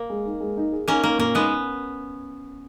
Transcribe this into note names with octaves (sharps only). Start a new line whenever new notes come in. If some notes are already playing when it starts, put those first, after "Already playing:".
Already playing: A#3
G#3
D#4
G#3
D#4
G#4
A#3 C#4 D#4
A#3 D#4
A#2 A#3
G#3 B3 D#4